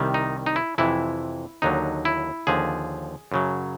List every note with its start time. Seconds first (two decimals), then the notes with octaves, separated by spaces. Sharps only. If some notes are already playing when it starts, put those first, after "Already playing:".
Already playing: C2 C3 D#3 G3
0.14 D#4
0.46 D#4
0.56 E4
0.78 F2 C3 E3 E4
1.62 D#2 D3 F#3 D#4
2.05 E4
2.47 D#2 D3 F3 G#4
3.32 F#2 C#3 F#3